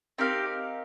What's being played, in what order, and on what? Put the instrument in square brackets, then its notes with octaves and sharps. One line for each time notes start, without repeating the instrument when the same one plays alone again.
[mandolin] C4 D#4 A#4 F5 [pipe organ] G4